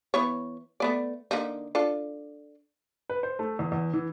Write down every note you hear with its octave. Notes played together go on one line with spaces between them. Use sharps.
E3 B3 C#5
A3 B3 D5
D3 A#3 D#4
D4 F4 A4
B4
C5
A3
E2
E2
E3